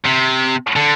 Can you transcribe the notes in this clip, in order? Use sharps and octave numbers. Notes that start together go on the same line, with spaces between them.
C3
D3